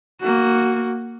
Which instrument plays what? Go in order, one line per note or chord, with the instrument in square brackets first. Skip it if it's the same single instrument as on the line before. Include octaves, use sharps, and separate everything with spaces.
[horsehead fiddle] A#3 F#4